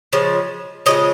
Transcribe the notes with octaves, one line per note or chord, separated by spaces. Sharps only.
C#3 F3 G#3
C#3 F3 G#3 D#5